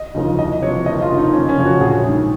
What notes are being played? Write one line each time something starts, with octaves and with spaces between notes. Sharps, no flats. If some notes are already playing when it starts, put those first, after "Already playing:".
Already playing: D#5
D#2 C#3 F3
C2 D#5
C3 F3 C#5
F#1 D#5
F4
F2 D#3
D#4
F#1 C#4
C#4
F2 C#3 F3
F#4
A#1 G#4
G#2 D#3